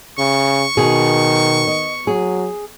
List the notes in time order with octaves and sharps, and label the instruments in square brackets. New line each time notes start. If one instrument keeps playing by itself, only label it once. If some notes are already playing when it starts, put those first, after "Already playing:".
[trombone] C#3 [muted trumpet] C#6
[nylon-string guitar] B2 G#4 [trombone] D#3
[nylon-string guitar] D#5
[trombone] F#3 [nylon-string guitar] G#4